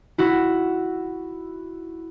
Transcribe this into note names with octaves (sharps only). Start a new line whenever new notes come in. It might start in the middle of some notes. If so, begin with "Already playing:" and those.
E4 F#4